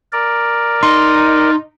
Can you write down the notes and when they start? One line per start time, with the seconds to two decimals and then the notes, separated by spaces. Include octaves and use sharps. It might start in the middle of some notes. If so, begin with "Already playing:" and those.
0.13 A#4 D5
0.83 D#4 C6